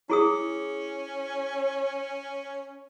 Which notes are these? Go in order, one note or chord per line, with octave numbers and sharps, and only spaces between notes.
C#4 E4 G#4 D#6